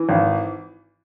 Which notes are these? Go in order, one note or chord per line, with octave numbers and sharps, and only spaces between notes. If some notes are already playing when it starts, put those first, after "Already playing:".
Already playing: E3
G#1